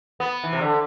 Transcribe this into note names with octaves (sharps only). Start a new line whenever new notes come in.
B3
E3
C3
D3